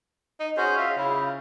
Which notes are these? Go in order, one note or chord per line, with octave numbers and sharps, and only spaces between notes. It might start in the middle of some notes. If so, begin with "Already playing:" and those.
D#4
C#4 F#4 G#4 C5
F4 E5
C#3 E4